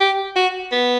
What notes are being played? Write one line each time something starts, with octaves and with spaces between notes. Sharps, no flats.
G4
F#4
B3